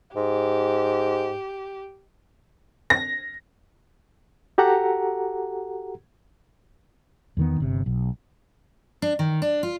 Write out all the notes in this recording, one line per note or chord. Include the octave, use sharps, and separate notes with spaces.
G#2 G4
A#6
F#4 G4 A4 F#5 A#5
E2 D#3 B3
G1 C3
B1
D4
D#3
D4
F4